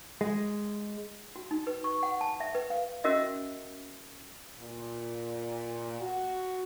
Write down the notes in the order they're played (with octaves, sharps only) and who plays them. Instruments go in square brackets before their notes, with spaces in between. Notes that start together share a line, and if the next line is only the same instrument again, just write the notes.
[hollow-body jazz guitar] G#3
[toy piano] F#4
D#4
B4
C#6
F#5
A5
E5
B4
F5
C#4 F#4 A#4 D#5 E5
[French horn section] A#2
F#4